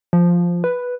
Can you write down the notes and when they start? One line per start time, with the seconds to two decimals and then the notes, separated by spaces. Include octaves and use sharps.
0.13 F3
0.64 B4